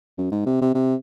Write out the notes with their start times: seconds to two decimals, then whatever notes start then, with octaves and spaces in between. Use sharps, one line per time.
0.18 F#2
0.31 G#2
0.46 C3
0.61 C3
0.74 C3